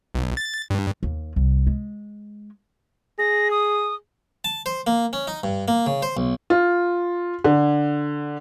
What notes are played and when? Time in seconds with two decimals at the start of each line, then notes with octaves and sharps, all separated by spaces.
0.15 B1
0.37 A6
0.70 G2
1.03 D#2
1.36 C2
1.67 G#3
3.19 G#4 A#6
3.51 D#6
4.44 A5
4.66 C5
4.87 A#3
5.13 C#4
5.27 D#4
5.44 G2
5.68 A#3
5.86 C#3
6.02 C5
6.17 B1
6.50 F4
7.44 D3